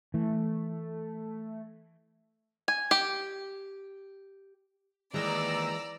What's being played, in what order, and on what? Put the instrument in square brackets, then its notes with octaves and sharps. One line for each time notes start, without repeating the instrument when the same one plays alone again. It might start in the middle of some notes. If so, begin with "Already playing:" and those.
[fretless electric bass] E3 [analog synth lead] A3
[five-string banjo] G#5
G4
[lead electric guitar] D#2 [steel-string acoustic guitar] E3 G#3 [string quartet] D5 [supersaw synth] A#5 E6